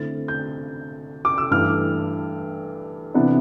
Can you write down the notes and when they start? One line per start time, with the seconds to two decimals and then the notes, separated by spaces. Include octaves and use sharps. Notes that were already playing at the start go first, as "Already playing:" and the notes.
Already playing: D3 A3 C4 E4 A6
0.28 G6
1.25 D6
1.38 E6
1.51 G2 E3 A3 D4 F6
3.15 C3 E3 B3 D4